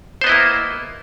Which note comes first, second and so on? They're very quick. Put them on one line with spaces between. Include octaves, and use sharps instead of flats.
C5 B3 D#5 E4 A#3